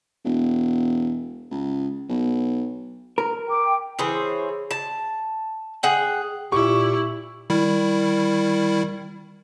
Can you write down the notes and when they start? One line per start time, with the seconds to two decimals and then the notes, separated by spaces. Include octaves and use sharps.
0.25 E1
1.51 C#2
2.09 B1
3.18 A#4
3.48 G5 D6
3.99 E3 G#4 C5 C#5
4.71 A5
5.83 G#4 F#5 G5
6.52 A#2 E4 G4 C#6
7.50 D#3 G3 E4